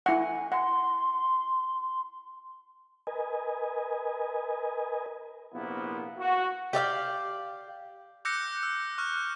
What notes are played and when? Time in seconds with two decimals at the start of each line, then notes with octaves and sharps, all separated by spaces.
0.06 E4 F#5 G#5
0.52 F#5 C6
3.07 A#4 B4 D#5 G#5
5.53 A#1 C3 A#3 B3 E4
6.19 F#4
6.73 G4 D5 E5 F5
8.25 D6 E6 F#6 G6 A#6 C#7
8.63 E6
8.98 C#6 F6 F#6
9.13 F#6